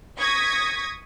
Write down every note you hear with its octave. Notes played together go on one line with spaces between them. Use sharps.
C#6 D#6 G#6 A#6 B6